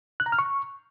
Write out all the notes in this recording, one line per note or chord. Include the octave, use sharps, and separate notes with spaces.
F#6
A#5
F6
C#6